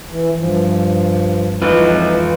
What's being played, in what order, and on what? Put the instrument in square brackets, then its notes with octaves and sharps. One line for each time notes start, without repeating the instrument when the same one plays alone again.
[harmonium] E3
G2 F3
[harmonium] F2 E3 D#4 [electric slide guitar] F4 B4